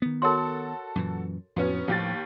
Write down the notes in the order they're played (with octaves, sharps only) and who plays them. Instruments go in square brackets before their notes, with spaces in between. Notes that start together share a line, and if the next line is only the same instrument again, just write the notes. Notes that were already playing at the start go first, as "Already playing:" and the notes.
[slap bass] D#3 B3
[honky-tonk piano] F#4 A4 [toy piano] A#4 C#5 C6
[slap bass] F#2 A#2 E3
[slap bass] F2 A2 [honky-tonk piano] F#3 B3 C#4
[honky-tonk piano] D#2 G4 A6 [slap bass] A2 F3